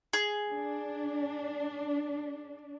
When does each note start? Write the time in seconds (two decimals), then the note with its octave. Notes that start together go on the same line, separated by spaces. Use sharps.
0.13 G#4
0.52 D4